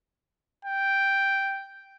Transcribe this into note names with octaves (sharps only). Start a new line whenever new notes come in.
G5